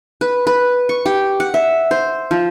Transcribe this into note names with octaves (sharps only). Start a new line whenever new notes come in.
B4
B4
C#6
G4
F#5
E5
C5
F3